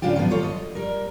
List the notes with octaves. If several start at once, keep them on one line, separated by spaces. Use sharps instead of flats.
A2 C#3 G3 D4 F4 G4
D#3 F3 F#3 B3
G3 F4 A4 C#5
D#5
G3 A#4